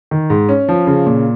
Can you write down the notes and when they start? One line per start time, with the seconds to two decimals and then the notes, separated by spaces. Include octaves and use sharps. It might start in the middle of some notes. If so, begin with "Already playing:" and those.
0.11 D#3
0.30 G#2
0.49 C#4
0.69 F3
0.87 C#3
1.06 A#2